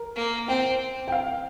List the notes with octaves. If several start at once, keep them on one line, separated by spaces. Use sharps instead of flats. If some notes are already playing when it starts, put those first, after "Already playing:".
Already playing: A#4
A#3
C4 G5
G5
F5